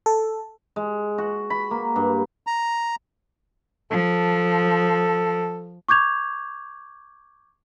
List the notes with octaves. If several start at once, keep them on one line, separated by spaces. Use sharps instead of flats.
A4
G#3
F#4
B5
A#3
G2
A#5
F3 A4
C#6 D6 G6 G#6 F7